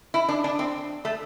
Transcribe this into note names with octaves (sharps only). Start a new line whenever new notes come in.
E4
D4
D4
C4
A3